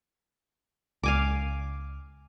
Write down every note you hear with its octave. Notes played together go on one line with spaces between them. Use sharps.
C#2 F5 G#5 D6